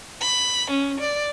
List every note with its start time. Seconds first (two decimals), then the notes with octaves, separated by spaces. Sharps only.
0.21 B5
0.70 C#4
1.00 D5